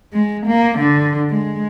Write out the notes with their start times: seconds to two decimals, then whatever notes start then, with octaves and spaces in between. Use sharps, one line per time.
0.13 G#3
0.46 A#3
0.79 D3
1.30 G#3